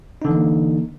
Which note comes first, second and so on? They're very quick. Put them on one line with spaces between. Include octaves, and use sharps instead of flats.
D#4 D3 E3 A#3